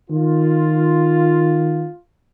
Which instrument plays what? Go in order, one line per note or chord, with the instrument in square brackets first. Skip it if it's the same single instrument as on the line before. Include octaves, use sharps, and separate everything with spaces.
[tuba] D#3 [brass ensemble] F4